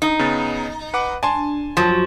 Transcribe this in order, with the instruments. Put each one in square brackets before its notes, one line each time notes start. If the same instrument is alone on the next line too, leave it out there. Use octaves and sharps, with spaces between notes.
[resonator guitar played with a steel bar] D#4
[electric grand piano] C#3 B3 A6
B4 F#5 D6
[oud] D4 [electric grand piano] G#5 A5 C6
[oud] F#2 F#3 [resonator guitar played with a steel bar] F3